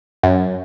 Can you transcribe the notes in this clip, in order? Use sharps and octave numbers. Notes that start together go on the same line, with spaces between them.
F#2